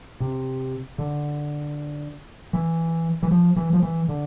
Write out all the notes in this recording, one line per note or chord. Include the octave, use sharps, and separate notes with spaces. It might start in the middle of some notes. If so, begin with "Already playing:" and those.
C3
D3
E3
E3
F3
E3
F3
E3
D3